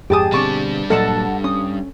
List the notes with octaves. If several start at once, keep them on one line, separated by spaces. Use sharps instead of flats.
F2 G#2 G4 G#4 G5 A5 D#6
B2 D3 G3 C4 D4 A5 C#6 D6
A#2 F#3 A#3 A4 D#5 F#5 A5
C#4 D#6